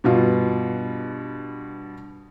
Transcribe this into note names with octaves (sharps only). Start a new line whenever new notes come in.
G2 B2 F4